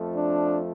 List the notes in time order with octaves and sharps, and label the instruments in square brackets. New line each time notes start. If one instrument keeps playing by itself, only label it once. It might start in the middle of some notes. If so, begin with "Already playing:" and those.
Already playing: [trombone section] F2 F3 A3
D4